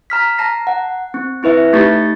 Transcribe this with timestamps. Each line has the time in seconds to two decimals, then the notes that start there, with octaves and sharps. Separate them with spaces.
0.10 A#5 F6 B6
0.38 A5 A#5 A#6 C7
0.67 F#5
1.14 C4
1.43 C4 E4 B4 E5
1.73 A3 D#4 G4 C#6 A6